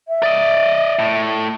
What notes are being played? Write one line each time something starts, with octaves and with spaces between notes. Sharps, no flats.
E5
D5 D#5
A2